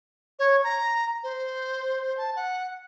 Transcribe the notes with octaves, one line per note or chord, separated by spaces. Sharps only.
C#5
A#5
C5
A5
F#5